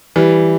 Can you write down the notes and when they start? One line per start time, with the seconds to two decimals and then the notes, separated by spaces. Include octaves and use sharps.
0.16 E3 G3